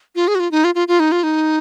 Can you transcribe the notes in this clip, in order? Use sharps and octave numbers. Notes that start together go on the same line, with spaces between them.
F4
G#4
F#4
F4
D#4
F4
F4
F4
D#4
F4
D#4